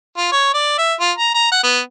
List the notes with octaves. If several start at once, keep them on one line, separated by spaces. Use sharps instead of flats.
F4
C#5
D5
E5
F4
A#5
A#5
F#5
B3